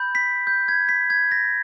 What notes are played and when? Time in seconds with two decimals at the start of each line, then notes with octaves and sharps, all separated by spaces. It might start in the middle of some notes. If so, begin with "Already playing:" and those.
Already playing: B5 G6
0.15 B6
0.47 G6
0.68 G#6
0.89 B6
1.10 G#6
1.32 A#6